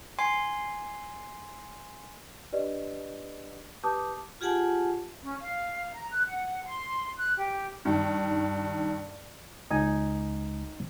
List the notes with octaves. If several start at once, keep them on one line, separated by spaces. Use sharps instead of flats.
G#5 C6 C7
D4 G4 B4 D5 D#5
G4 B4 A5 D6 D#6 G6
F4 G4 G#4 F#5 G#5 A5
C#4
F5
A#5
F#6
F#5
C6
F#6
G4
G2 D#3
C#2 D#4 G#5